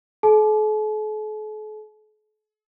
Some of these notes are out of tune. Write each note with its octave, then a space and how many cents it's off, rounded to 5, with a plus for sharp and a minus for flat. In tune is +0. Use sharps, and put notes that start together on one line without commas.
A4 -45 A5 -45